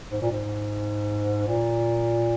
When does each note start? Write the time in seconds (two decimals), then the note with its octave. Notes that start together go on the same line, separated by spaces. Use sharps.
0.12 G#2
0.22 A#2
0.31 G#2
1.48 A#2